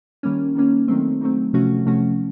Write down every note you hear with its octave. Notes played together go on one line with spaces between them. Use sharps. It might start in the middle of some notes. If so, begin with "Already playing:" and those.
D#3 G3 A#3 C#4
D#3 G3 A#3 C#4
D#3 F#3 A3 C4
D#3 F#3 A3 C4
C3 F3 A3 C#4 F#4
C3 F3 A3 C#4 F#4